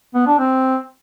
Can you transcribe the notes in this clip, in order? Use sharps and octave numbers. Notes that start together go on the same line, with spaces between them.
B3
D4
C4